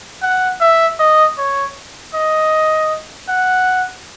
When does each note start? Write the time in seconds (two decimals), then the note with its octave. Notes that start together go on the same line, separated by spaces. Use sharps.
0.22 F#5
0.61 E5
0.99 D#5
1.38 C#5
2.14 D#5
3.28 F#5